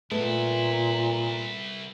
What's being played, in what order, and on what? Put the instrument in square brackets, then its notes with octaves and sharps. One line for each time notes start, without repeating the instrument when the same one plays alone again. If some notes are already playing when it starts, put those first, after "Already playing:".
[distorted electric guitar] C2 E4 [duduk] A#2 [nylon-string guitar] A3 B3